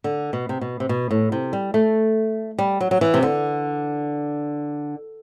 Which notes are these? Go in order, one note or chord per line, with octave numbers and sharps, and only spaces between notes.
D3
B2
C3
B2
C3
B2
A2
C3
G3
A3
G3
F#3
F#3
E3
C3
D3